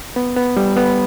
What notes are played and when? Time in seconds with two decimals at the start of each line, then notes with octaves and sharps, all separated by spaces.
0.16 B3
0.37 B3
0.57 G3
0.77 B3